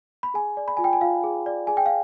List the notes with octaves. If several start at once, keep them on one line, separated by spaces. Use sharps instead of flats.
B5
G#4 G#5
D5
B5
F4 G#5
G5
G#5
F4 F5
G#4
D5
G#4 G#5
G5
F5